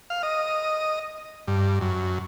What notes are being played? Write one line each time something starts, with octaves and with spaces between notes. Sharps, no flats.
F5
D#5
G2
F#2